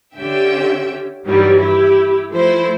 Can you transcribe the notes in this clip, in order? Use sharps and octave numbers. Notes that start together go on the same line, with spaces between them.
D3 C#4 G4 E5 G5
G2 D#3 E3 F#3 G3
E4 G4
F3 A3 E4 C5